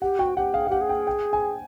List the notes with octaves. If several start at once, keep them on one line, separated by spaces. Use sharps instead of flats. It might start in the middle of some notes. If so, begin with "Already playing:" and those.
G4 F#5
F#4 G5
G4 F#5
G#4 F5
G4 F5 F#5
G#4
G5
G5
G#5